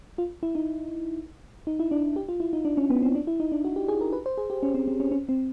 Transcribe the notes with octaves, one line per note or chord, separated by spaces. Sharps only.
F4
E4
D#4
D#4
E4
D4
G4
F4
E4
D#4
D4
C#4
B3
C4
D4
E4
D#4
D4
F#4
G4
G#4
A#4
B4
C5
G#4
G4
C#4
C4
C4
C#4
C#4
C4